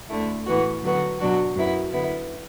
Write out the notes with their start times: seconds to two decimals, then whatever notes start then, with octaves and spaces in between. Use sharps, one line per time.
0.09 D2 D3 A3 E4
0.45 A2 E3 B3 F#4
0.82 D3 F#3 B3 F#4
1.19 B2 F#3 D4 F#4
1.55 F#2 F#3 B3 E4
1.91 D3 B3 E4